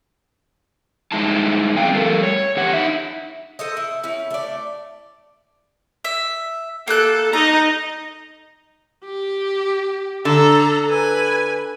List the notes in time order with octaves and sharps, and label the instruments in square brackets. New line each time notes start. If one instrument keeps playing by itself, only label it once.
[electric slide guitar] G2 G#3 D#4 E4 A5
C4 E4 F5 G5
G3 A4 A#4
C#5
E2 G4 F#5
D#4 E5
[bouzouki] A4 C5 D#5
E4
C#4 E4
A3 D5
[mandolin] E5
[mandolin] A#3 F#6 [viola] A4
[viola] D#4 D#5 [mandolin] A#5
[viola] G4
[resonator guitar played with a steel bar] D3 [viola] A4 A#5
[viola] B4 G#5